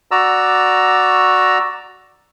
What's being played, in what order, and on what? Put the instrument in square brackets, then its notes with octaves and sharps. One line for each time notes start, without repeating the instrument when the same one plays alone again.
[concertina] F#4 D5 A#5 E6